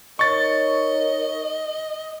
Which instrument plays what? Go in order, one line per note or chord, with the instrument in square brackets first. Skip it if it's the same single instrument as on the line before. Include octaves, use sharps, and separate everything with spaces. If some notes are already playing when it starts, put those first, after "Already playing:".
[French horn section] D#4 A#4 C#5 [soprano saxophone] D#5 [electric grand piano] C#6 A6